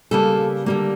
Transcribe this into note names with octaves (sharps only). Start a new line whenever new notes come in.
C#3 G3 A#3 A4
D3 G3 A#3